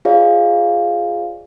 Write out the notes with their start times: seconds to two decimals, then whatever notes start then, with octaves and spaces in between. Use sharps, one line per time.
0.05 F4 G#4 C5 D5 D#5 F5